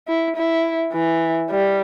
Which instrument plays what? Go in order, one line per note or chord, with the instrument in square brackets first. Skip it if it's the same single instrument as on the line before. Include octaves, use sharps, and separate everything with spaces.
[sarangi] E4
E4
E3
G3